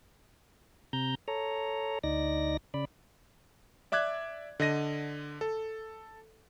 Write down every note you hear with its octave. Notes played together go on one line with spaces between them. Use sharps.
C3 A#5 G6
A4 C#5 A#5
D2 D#4 D5 A#6
C#3 D5 B5
D5 E5 D6 F#6 G#6
D3 D#5 A#6 D#7
A4